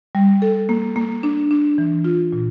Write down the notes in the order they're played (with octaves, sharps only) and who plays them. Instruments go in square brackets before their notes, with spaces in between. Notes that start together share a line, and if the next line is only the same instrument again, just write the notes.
[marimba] G3
A4
A#3
A#3
D4
D4
E3
F4
A#2